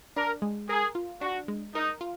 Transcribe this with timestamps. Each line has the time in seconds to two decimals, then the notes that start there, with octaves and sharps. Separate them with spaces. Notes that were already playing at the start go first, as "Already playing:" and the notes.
0.16 D4 A#4
0.42 G#3
0.69 G#4 A#4
0.95 F4
1.21 D4 F#4
1.48 G#3
1.74 D#4 A#4
2.01 F4